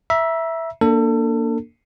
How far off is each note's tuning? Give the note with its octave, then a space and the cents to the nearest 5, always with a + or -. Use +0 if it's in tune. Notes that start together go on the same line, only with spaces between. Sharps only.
E5 +0 A#5 +40
A#3 +0 D4 +0 A4 +30